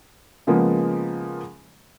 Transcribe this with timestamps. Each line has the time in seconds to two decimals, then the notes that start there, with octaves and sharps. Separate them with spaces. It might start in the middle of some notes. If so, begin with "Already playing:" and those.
0.47 C#3 F3 G#3 A#3 B3